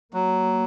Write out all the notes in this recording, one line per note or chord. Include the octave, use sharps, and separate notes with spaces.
F#3 A#3